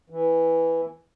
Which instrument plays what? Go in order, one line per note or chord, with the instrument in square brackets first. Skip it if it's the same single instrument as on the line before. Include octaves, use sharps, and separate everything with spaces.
[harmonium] E3